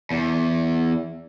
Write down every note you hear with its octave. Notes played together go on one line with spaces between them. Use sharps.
E2